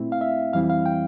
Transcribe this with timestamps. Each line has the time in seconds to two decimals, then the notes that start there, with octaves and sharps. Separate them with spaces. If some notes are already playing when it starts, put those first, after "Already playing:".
Already playing: A#2 A3 C4 E4
0.12 F5
0.21 E5
0.53 F2 E3 G3 C4 E4 F5
0.70 F5
0.86 G5